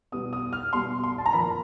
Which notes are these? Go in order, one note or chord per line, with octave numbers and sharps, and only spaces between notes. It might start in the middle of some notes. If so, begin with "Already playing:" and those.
B2 G3 B3 D#6
D#6
F6
B2 G3 B3 C6
C6
A5
A#5
A#2 F3 A#3 B5